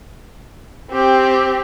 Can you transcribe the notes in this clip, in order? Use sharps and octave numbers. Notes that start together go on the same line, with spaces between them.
C4 G4